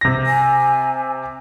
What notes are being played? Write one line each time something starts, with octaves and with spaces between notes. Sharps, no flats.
C3 A#6
G#5